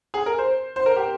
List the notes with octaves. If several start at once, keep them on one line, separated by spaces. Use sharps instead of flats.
G#4
A#4
C5
C5
A#4
G4